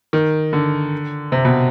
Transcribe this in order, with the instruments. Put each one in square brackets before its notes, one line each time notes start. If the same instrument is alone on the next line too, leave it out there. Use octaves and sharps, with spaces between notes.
[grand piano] D#3
D3
C3
B2